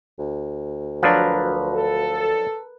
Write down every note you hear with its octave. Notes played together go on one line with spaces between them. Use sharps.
D2
F3 F#3 D4 A#4 B4
A4